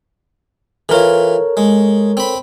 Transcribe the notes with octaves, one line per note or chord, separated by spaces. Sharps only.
E3 F4 A4 A#4 C#5
G#3
C4 B5